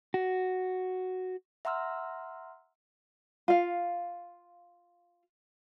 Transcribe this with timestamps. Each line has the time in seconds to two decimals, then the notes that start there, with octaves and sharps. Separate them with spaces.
0.14 F#4
1.65 E5 F#5 A#5 C6 E6 F6
3.48 F4 F5